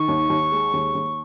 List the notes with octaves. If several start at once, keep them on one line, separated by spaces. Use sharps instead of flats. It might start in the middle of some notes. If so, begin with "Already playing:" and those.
Already playing: D#3 C#6
D#2
D#2
G#3
D#2
D#2